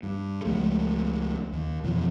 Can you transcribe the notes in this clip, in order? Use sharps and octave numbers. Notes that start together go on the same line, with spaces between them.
G2
C#2 F3 G#3 A3
D#2
F2 B2 E3 F3